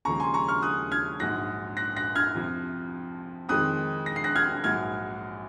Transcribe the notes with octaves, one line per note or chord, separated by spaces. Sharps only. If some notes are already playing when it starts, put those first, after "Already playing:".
D#2 C#3 F3 G#3 A#5 C#6
G#5 C6
A#5 C#6
C#6 F6
D#6 F#6
F6 G#6
A#1 G#2 F#3 F#6 A#6
F#6 A#6
F#6 A#6
F6 G#6
F2 C3 F3
F2 D#3 G#3 D#6 F#6
A#6
C7
F#6 A#6
F6 G#6
A#1 G#2 F#3 F6 G#6